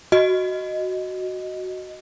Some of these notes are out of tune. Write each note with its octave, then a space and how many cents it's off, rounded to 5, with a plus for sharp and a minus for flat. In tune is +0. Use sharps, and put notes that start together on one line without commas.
F#4 +5 D#5 +0